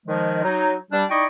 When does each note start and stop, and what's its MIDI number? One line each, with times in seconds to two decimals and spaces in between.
0.06 0.39 51
0.06 0.39 53
0.06 0.39 56
0.43 0.74 54
0.43 0.74 63
0.91 1.03 55
0.91 1.03 62
1.10 1.25 63
1.10 1.25 64
1.10 1.25 74
1.10 1.25 75
1.10 1.25 79
1.10 1.25 85